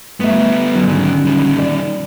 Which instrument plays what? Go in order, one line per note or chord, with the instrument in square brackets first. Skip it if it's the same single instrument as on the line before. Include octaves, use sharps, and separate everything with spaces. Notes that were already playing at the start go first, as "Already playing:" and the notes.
[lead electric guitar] G3 B3 [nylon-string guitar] A3 E5
[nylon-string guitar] D3 F#3 C#4
[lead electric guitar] G#2 D#3
D#3 G3
[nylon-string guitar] D5